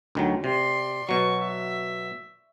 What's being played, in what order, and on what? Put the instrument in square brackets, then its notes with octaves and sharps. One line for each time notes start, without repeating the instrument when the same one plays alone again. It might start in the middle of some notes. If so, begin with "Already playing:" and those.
[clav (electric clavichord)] D2 D#3 F#3
[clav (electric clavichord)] C3 [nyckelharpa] D5 C6
[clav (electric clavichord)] B2 F#3 [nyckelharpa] C#6
[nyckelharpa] E5